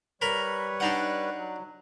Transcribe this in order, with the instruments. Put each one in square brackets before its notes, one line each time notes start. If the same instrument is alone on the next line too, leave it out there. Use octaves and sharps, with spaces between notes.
[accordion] G3 B4 C#5 [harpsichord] A#4 B5
[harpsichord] D4 D#4 F#5
[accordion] F#3